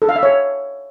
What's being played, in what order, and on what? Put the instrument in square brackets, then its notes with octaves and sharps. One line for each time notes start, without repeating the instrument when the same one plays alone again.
[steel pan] A4
F5
E5
C#5